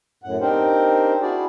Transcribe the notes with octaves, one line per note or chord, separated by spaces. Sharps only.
F#2 A2 F#5
C4 D4 D#4 G4 A#4 C5
D4 E4 F#4 G#4 D5